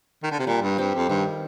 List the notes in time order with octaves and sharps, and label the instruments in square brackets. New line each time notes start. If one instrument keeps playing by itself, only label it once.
[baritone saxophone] D#3
D3
C3
[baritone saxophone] A#2 [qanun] G3
[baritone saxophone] G2
[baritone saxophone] G2 [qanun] C4 G4
[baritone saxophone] F2
[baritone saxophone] G2 [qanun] D#3